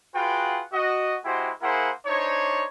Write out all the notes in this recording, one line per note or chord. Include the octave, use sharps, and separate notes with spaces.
F4 F#4 G#4 B4 F#5 G5
F#4 D#5
G#3 E4 F#4 G4 C5 G5
A#3 E4 G#4 A#4 C5 F#5
D4 D#4 C5 C#5